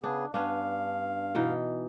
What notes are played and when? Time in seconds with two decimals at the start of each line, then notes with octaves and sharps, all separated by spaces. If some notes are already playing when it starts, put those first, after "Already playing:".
0.04 C#3 B3 D4 G#4
0.34 G2 B3 C#4 D4 F5
1.35 B2 E3 D#4